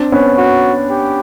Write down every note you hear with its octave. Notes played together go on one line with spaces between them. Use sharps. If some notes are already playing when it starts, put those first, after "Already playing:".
Already playing: C4 D4
B3 C#4
F#4
G4